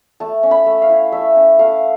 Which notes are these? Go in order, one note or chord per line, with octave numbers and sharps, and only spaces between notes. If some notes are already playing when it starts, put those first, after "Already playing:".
A3 A5
C#4
B5
A3
F5
E4
A3 E5
C#4
A3 F5